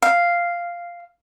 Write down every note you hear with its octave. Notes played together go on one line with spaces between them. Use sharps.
F5